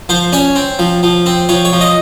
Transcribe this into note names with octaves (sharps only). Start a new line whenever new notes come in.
F3 C5
C#4 C#5
C4
F3
F3
C4
F3 C#5
C#5
F3
D#5